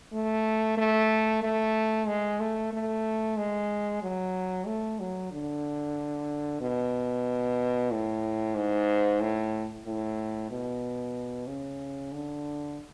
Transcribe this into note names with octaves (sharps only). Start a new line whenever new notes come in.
A3
A3
A3
G#3
A3
A3
G#3
F#3
A3
F#3
D3
B2
A2
G#2
A2
A2
B2
C#3
D3